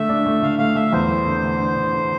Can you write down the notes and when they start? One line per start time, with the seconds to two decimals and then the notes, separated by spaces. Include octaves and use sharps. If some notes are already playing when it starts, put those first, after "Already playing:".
Already playing: D3 A3 E5
0.09 D4
0.26 A3
0.42 D3 F5
0.59 A3 F5
0.75 A3 E5
0.93 E2 C5
1.09 A3
1.26 D3
1.43 A3
1.59 D4
1.76 D3
1.93 D3